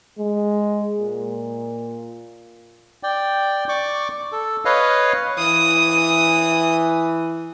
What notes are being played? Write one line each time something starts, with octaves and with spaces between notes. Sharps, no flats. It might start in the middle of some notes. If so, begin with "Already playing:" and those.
G#3
A#2
D5 G5
D5 C#6 D6
A4
B4 C#5 D#5 F5
E3 D#6